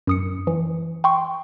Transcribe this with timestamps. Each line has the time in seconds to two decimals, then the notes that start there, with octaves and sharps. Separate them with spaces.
0.07 F#2 D#6 C#7
0.47 E3
1.04 G5 C6 C#6